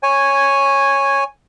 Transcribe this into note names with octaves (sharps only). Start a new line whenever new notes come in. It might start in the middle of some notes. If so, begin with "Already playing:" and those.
C#5 G#5